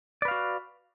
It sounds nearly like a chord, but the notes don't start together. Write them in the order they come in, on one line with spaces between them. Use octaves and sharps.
D5 B4 F5 F#4